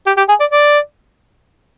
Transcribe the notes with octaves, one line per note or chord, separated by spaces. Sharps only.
G4
G4
G#4
D5
D5